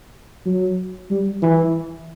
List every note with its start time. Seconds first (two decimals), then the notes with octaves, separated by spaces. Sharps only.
0.46 F#3
1.10 G3
1.42 E3